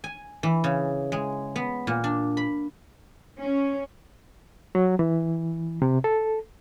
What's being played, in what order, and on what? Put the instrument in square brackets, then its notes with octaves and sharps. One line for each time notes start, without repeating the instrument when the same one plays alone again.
[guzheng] G#5
E3
C#3
G#3
B3
A#2
D4
B5
[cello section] C#4
[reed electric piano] F#3
E3
C3
A4